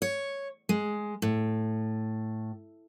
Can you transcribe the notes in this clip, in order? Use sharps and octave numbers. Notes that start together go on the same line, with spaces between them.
C#5
G#3
A2